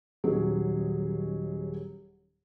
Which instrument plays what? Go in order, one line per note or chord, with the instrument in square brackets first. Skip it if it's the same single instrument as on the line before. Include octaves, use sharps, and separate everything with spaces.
[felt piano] D#1 D#3 F#3 C#4 G#4